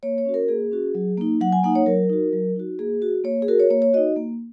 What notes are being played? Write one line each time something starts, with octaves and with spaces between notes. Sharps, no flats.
A#3 C#5
C#5
C#4 F#4
A#4
A#3 G#4
C#4 F#4
F#3
A#3 D#4
F#3 F#5
G#5
A#3 D#4 F#5
C#5
F#3 A#4
D#4 F#4
F#3
D#4 F#4
A#3 G#4
F#4
A#3 C#5
G#4
F#4 A#4
C#5
A#3 C#5
C#5
D#4 F#4 D#5
A#3